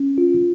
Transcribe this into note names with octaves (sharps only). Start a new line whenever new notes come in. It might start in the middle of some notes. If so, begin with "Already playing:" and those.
Already playing: C#4
F4